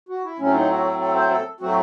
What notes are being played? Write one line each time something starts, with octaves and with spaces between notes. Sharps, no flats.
F#4
E4
A2 F#3 A3 C4 C#4
D#4
F#4
A4
A4
C5
A4
A2 F#3 A3 C4 F#4